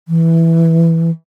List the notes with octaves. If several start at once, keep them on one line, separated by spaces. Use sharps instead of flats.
E3